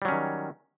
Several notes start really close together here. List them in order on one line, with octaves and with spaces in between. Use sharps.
G3 F#3 C#4 D#3